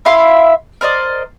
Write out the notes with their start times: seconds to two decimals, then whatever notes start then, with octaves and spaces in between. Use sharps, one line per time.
0.05 E4 E5 F5 C6
0.81 A#4 C5 D5 D#5